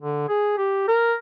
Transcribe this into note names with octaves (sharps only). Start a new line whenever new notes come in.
D3
G#4
G4
A#4